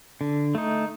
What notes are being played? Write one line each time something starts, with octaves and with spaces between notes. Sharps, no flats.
D3
A3 D#4